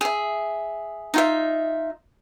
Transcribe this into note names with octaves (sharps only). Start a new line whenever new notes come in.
G#4 E5
D#4 F4 E5